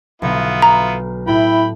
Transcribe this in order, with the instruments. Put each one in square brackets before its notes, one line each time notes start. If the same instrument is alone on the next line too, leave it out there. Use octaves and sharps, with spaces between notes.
[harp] B1 B2 D3 [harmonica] B3 E4 F4
[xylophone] A#5 [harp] F6
[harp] A2 [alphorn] E4 [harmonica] G5 B5